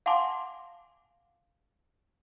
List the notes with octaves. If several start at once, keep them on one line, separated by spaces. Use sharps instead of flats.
F5 F#5 G#5 A5 C6 D6